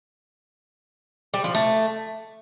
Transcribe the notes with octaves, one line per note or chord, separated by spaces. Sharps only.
G3
F3
A3